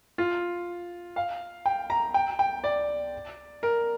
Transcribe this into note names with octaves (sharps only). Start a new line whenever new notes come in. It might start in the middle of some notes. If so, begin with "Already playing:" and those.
F4
F5
G5
A#5
G5
G5
D5
A#4